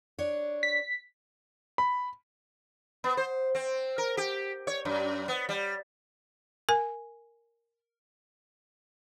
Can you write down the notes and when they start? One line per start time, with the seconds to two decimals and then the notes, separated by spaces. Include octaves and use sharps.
0.19 D4 C#5
0.63 B6
1.78 B5
3.04 B3
3.17 C5
3.55 C4
3.98 A#4
4.17 G4
4.67 C#5
4.85 F#2
5.28 B3
5.49 G3
6.69 A#4 G#5